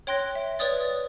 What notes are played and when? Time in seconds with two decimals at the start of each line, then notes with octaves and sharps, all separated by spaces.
0.07 C#5 G5 C6 F#6 A#6
0.35 E5
0.59 B4 C#5 D5 D#6 A6